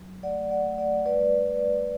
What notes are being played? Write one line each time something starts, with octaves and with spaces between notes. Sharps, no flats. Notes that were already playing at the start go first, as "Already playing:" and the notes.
Already playing: F#3
A3 D5 F#5
D5 F#5
A3
D5 F#5
G3 B4 D5